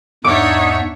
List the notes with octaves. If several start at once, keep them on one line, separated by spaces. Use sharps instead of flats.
E2 G#2 D4 D#4 C#5 E5 F#5 D6